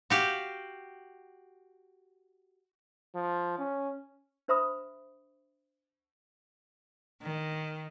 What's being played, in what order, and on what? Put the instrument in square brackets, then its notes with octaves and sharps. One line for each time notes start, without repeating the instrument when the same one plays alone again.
[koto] F#4 G4 F5
[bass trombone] F3
C#4
[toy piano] D4 C5 E5 A#5 B5 D#6
[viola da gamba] D#3